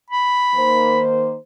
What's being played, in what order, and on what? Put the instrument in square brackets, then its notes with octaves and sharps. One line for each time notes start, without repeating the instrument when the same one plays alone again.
[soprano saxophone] B5
[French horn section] D#3 A#3 C5